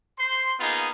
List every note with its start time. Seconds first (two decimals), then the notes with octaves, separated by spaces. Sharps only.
0.19 C5 C6
0.59 A#3 B3 D#4 F4 G#4